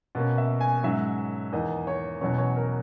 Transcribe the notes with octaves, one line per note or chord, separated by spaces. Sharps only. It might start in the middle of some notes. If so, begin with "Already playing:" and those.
B2 A#3 C#4
E5
G#5
G#2 F#3 C#4 E5
E2 D#3 A#3 D#5
C#5
E2 B2 F#3 C#4 C#5
C#5
A#4